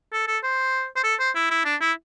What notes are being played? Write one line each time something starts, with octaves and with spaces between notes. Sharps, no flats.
A4
A4
C5
C5
A4
C5
E4
E4
D4
E4